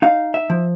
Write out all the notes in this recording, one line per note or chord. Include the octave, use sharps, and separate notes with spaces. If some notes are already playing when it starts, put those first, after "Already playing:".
D#4 F5
E5
F3